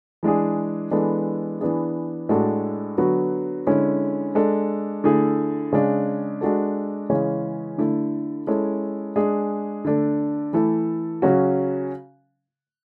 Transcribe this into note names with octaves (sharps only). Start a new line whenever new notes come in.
E3 G#3 D4 G#4
E3 G#3 B3 D4 A4
E3 B3 D4 G#4
A2 G#3 D4 F#4 A4
D3 F#3 B3 F#4
D3 G#3 C#4 E4
G#3 D4 A4
D3 A3 E4 G#4
C#3 G#3 D4
G#3 D4 F#4 A4
C#3 E3 G#3 C#4
D3 A3 E4 A4
G#3 C#4 E4 A4
G#3 D4 G#4
D3 A3 D4 A4
E3 A3 E4 A4
C#3 F#3 C#4 F#4